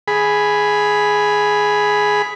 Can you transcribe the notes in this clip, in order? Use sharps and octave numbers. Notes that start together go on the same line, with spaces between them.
G#4 B5